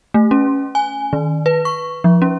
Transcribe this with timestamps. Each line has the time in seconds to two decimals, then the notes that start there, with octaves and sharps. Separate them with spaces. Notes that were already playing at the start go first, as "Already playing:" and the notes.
0.14 A3
0.31 C#4
0.75 G#5
1.13 D#3
1.46 B4
1.65 C#6
2.04 F3
2.22 C#4